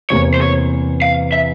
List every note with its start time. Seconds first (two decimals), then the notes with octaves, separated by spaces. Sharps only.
0.10 E2 C3 E3 A#3 C#5
0.34 C5
0.41 C#5
1.02 F5
1.32 E5